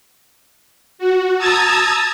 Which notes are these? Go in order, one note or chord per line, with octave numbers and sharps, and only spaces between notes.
F#4
A5 A#5 D#6 E6 G#6 A6